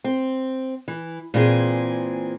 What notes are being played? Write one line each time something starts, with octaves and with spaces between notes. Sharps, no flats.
C4
E3
A#2 E3 C4 G#4